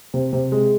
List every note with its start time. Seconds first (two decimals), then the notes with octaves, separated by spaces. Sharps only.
0.14 C3
0.33 C3
0.52 G#3